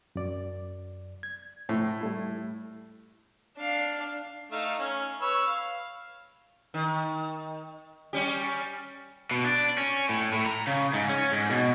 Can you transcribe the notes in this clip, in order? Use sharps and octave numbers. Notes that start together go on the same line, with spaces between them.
F#2 D5
G#6
A2
G3 A3 E4
D4 F5
A3 D#4 F5
C#4
B4 C#5 E6
F5
D#3
G3 C#4 G4
B2
D4
C#4
A2
A2
A#5
C#3
G#2
C#4
G#2
B2